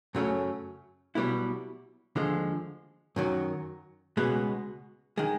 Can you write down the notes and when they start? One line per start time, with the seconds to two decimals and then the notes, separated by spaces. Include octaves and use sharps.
0.15 F#2 C#3 F#3 A3 C#4
1.15 B1 B2 G3 B3 E4
2.16 D#2 D3 F3 G#3
3.16 F#2 D#3 F#3
4.17 C#2 B2 G#3 B3
5.18 D#3 G#3